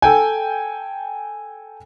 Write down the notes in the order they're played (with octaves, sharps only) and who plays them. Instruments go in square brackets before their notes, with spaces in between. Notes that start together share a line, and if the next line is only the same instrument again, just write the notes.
[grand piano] A4 G5 G#5